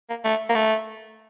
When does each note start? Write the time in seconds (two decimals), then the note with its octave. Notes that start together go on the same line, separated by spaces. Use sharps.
0.10 A#3
0.25 A3
0.49 A#3
0.55 A3